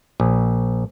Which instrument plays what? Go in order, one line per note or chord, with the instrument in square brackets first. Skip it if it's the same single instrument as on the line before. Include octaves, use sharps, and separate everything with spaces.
[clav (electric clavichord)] A#1